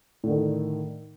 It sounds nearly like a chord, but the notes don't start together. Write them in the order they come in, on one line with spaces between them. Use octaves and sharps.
A2 D3 D#3